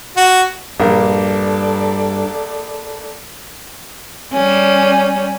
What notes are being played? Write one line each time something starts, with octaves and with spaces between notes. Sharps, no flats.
F#4
A#1 G2 A#3 A4 D5
G3 C#4